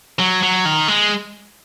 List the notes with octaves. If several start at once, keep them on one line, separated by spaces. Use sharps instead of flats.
F#3
F#3
D#3
G#3